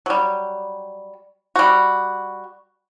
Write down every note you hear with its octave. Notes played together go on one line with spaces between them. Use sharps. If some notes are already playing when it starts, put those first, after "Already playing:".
F#3 G3
G3 F#4